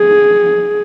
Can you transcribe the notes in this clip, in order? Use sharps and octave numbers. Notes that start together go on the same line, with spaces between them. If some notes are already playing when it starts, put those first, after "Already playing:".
Already playing: G#4